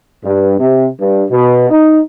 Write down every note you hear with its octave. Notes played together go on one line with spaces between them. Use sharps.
G2
C3
G2
B2
D#4